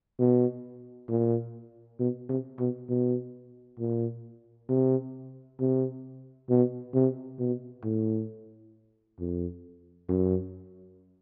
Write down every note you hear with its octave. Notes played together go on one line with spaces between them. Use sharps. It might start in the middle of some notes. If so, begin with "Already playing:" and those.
B2
A#2
B2
C3
B2
B2
A#2
C3
C3
B2
C3
B2
A2
F2
F#2